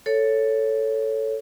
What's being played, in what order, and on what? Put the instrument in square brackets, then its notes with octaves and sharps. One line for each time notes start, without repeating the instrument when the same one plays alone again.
[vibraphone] A4 C#5